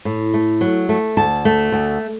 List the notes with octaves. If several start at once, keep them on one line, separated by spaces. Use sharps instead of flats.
A2
A3
F#3
A3
D2 A5
A3
D2